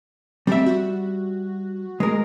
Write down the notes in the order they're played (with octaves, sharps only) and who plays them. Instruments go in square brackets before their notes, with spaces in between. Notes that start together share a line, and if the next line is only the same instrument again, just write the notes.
[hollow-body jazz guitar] G3 E5 [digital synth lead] C4
[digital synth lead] F#4
[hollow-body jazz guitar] G#3 A#4